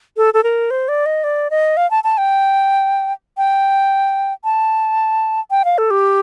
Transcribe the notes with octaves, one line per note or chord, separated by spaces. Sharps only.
A4
A4
A#4
C5
D5
D#5
D5
D#5
F5
A5
A5
G5
G5
A5
G5
F5
A4
G4